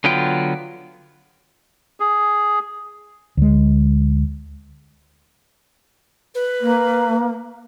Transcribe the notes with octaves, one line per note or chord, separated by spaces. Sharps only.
D3 F#3 B3 F4 G5
G#4
D2 G#3
B4
A#3